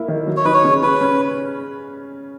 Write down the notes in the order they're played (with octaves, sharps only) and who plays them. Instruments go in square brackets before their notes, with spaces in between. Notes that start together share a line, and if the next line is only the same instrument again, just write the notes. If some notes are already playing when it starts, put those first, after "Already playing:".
Already playing: [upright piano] A#3 E4
D#3
F#3
[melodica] C#5
[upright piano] D#4 [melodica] B4
[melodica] C#5
[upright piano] C#3
[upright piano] C#3 [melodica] B4
[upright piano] C#4